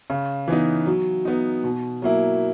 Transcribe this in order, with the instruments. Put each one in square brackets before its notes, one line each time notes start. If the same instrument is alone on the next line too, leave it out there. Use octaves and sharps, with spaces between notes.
[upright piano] C#3
E3 B3 D#4
F#3
B3 D#4
B2
F#3 A#3 E4